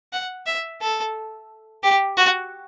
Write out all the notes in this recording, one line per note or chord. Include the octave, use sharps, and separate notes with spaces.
F#5
E5
A4
G4
F#4